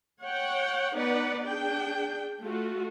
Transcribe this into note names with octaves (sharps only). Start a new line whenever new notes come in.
C#5 F#5 G5
B3 D#4 B4 D5 F#5
D4 G#4 G5
A3 F4 F#4